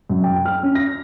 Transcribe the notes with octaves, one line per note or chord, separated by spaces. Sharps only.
F#2
G5
F6
C#4
A#6